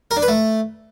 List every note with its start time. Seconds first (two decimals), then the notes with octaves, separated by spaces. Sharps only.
0.11 A#4
0.17 D4
0.22 B4
0.28 A3